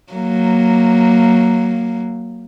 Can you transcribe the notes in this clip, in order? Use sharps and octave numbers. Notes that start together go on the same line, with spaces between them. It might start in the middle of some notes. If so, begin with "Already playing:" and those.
F#3 A#3